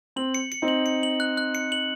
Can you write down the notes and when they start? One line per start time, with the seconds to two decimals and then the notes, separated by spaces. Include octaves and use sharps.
0.16 C4 F#7
0.34 C#7
0.52 C#7
0.62 C4 D#4
0.68 F#7
0.86 C#7
1.03 F#7
1.20 F#6
1.37 F#6
1.55 C#7
1.72 F#7